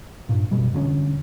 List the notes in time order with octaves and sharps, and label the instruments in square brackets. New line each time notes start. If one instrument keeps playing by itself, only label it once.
[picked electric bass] G2 A#2
F#1 C#2 B2 G3
E2 D3 G#3 C#4